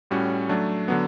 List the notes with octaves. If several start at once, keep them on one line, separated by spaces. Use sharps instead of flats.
A2 G3 C#4 F#4
F#3 A3 D4
D3 F#3 B3